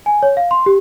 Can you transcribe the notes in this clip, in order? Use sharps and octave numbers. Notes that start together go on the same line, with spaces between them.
G#5
C#5
F5
C6
G4